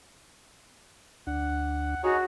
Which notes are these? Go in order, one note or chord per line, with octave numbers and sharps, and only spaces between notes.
D2 D4 F#5
D#4 F#4 G#4 C#5